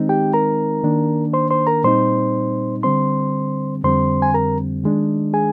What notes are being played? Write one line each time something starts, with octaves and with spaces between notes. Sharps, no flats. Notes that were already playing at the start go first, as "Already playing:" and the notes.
Already playing: D#3 G#3 C4 D#4
G4 G5
A#4 A#5
D#3 A#3 D4
C5 C6
C5 C6
A#4 A#5
A#2 G3 C4 D#4 C5 C6
D3 G3 C4 C5 C6
F2 D3 G3 C4 C5 C6
G#5
A#4 A#5
D#3 G#3 D4
G#4 G#5